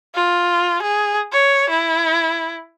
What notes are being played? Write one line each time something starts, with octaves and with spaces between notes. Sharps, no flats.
F4
G#4
C#5
E4